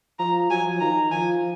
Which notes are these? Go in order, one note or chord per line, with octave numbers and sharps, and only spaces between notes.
F3 A#5
F#3 G#5
F3
D#3 A#5
F3 G#5